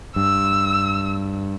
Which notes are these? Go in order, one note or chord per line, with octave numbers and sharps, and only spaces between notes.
G2 E6